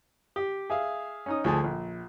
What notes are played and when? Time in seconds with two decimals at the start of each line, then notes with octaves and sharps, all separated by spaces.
0.36 G4
0.70 G#4 E5 F5
1.26 C#4 D#4 D#6
1.44 D2 F3 G#4 A5
1.64 A#1